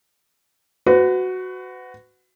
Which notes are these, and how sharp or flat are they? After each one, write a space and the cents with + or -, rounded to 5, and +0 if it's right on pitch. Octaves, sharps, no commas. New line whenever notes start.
F#4 +0 B4 +35